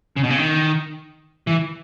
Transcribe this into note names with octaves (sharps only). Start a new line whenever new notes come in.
C#3
B2
C#3
D#3
E3